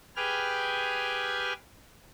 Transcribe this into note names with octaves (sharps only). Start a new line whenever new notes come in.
G4 G#4 B4 G5 G#5 F6